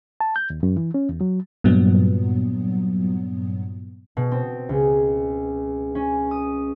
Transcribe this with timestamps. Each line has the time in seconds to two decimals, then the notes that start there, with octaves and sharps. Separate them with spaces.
0.21 A5
0.36 G6
0.50 D#2
0.63 F#2
0.77 E3
0.94 C#4
1.09 E2
1.21 F#3
1.64 G2 A#2 F#3 B3
4.17 B2
4.31 C4
4.69 C#2
5.95 C#4
6.31 D#6